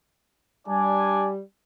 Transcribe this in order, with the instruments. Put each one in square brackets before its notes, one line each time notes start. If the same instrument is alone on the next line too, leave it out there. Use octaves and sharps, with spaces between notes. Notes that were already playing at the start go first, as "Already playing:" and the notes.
[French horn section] G3 [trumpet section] D4 D5 G#5